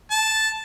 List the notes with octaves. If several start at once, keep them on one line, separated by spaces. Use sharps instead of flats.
A5